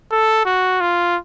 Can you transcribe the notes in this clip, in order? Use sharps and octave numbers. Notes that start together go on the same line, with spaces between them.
A4
F#4
F4